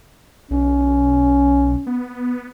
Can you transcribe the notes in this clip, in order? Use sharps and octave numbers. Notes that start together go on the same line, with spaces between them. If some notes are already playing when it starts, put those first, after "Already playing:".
B1 C#4
B3